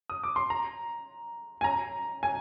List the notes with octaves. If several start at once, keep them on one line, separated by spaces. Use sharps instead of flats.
D#6
D6
C6
A#5
G#5
A#5
G#5